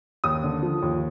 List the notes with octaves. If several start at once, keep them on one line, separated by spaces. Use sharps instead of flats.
D#2 D#6
D3
F3
D#2